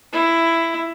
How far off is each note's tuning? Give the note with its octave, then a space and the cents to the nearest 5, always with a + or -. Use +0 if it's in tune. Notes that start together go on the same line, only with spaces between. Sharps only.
E4 +10